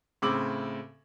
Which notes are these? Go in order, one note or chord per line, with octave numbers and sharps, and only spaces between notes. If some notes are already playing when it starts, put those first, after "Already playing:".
A2 C#3 C4 D6 E6 F#7